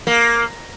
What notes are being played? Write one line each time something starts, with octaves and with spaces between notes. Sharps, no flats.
A#3